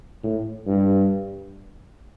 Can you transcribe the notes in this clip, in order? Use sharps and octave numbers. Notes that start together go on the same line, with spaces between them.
A2
G2